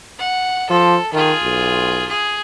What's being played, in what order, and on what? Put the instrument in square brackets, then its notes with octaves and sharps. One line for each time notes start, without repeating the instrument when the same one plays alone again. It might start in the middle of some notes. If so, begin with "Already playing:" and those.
[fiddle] F#5
[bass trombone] F3 [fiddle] A4
[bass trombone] D#3 [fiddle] F4 G#4
[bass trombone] B1
[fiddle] G#4